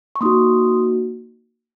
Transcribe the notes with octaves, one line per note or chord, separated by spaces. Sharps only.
C#6
A#3 D#4 F#4 C6 D#6